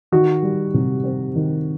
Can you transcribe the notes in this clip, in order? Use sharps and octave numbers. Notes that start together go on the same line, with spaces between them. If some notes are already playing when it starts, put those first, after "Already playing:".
D#3 F#4
G3
C3
C4
D#3